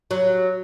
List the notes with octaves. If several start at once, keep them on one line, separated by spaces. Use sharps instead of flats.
F#3